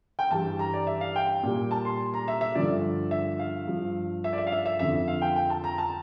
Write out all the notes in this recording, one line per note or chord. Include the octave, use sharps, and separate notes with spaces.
G5
G2 E3 G3 A5
A#5
D5
E5
F5
G5
A#2 G3
A5
C6
A#5
E5
E5
G2 D3 F3 D5
E5
F5
G2 F3
E5
D5
E5
F5
E5
E5
F2 D3 F3 E5
F5
G5
G5
A5
A#5
A5